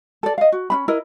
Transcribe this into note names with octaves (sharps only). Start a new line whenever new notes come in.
A4 D5
D#5 F5
F#4
C#4 D4 B5
E4 A#4 D#5